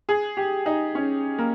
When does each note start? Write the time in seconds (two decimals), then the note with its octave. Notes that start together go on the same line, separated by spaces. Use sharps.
0.09 G#4
0.37 G4
0.66 D#4
0.95 C#4
1.38 A#3